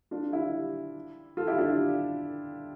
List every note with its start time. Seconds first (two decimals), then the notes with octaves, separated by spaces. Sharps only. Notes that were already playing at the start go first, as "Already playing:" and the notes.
0.11 D4 F4
0.32 E4 G4
1.37 F4 A4
1.47 E4 G4
1.58 D4 F4